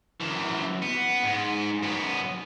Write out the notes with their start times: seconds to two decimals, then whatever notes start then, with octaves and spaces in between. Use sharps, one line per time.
0.20 F#2 E3
0.82 B3
1.23 G#2
1.83 F#2 B3